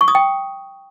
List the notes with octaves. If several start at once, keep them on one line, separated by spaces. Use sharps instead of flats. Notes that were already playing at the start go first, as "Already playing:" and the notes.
C#6
D#6
G5